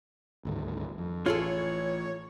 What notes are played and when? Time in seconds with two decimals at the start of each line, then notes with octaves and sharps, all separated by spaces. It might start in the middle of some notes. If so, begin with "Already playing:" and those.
0.45 G#1 D2 G2
0.98 F2
1.26 A1 F4 G#4 A4 C#5